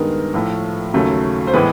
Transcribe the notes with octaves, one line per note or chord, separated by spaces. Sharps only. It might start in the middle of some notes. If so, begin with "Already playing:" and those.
Already playing: G2 D#3 G#3 B3 A#4
A2 F3 A3
D#2 C#3 F#3 A3
C5
A2 E3 G#3 B3 B4